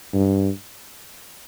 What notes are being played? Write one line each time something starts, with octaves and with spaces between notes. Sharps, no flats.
G2